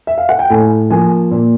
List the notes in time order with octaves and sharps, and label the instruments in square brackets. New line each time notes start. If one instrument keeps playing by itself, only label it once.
[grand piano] E5
F5
F#5
G5
A2 G#5
F3 A#3 G#5
A#2